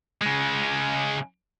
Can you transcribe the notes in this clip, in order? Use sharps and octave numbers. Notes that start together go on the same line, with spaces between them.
C#3 G#3